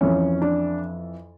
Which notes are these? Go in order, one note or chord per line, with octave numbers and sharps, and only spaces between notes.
F2 E3 C#4
D4